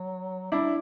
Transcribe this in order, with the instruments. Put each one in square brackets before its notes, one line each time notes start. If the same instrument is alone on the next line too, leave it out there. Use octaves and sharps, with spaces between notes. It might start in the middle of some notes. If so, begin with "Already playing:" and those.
Already playing: [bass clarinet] F#3
[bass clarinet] G3 [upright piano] D4 E4